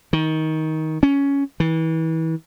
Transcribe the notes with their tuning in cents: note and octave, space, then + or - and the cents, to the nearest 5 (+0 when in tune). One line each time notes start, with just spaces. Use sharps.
D#3 +20
C#4 +10
E3 -30